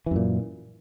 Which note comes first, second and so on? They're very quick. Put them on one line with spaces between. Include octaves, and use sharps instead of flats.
E3 F#2 A#2